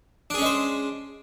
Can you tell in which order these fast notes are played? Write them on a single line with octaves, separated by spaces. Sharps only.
D4 G#4 C#4 G#3 C5